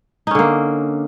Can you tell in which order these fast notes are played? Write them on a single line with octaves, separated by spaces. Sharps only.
D#4 C#4 D3 A#3